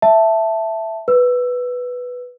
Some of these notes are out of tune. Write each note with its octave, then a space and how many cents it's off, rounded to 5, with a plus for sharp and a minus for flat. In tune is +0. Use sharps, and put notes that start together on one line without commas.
E5 +0 A5 +0
B4 +0 E6 +15